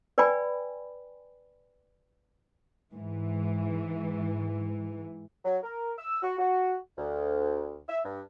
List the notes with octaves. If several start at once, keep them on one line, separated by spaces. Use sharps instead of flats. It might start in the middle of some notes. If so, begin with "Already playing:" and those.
B4 D5 G5 G#5 B5
G#2 E3
F#3
A#4
E6
F#4
F#4
D2
E5
G2